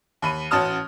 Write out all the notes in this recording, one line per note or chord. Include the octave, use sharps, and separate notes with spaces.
D#2 B5 D#7
A1 C#4 F#4 A5 D#6 F6